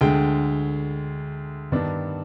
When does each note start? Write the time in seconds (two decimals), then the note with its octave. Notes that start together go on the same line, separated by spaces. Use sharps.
0.01 D2 D3 G#3 G5
1.72 G2 D#3 B3 D4